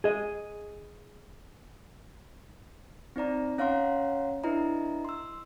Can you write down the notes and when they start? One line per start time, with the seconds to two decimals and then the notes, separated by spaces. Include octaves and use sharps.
0.04 G#4 D#5
3.16 C4 D#4 D5 A#5
3.58 C#4 C#5 F5 F#5 A#5 C6
4.44 D4 E4 B4 D#5 A#5
5.05 C6 E6